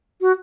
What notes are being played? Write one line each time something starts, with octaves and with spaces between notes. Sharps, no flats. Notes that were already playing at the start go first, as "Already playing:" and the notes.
F#4